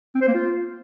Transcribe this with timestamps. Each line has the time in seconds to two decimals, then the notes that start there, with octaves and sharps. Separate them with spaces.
0.15 C4
0.21 C5
0.28 A#3
0.34 F4